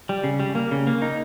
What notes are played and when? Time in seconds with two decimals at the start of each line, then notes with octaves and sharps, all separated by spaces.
0.09 G3
0.24 C#3
0.40 G3
0.55 A#3
0.71 C#3
0.87 A#3
1.02 D#4